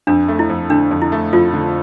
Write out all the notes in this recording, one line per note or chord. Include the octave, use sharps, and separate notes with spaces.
F2 D4
A3
E4
F2
D3 D4
F2
E4
A3
F2 F4
D3